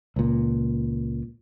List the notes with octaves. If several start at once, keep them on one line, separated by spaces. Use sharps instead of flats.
C#2 A#2